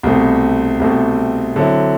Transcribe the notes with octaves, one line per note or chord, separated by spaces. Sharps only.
C2 B2 A3 C4
C2 B2 A3 C4
D3 F#3 C4 E4